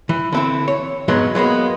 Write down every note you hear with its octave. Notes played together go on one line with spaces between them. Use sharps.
E3
D3 C4 E4
C#5
F2 G#2 F#3 G#3 B3
F#3 G#3 A#3 B3